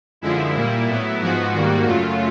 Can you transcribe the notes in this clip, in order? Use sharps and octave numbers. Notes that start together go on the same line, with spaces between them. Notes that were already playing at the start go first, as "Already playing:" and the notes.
F#2 D3 F3 G#3 E4
A#2 G3 A#3
A2 F#3 B3
G#2 F3 G#3 B3 F#4
G#2 D#3 G3 A#3
F#2 C#3 F#3 A3 F4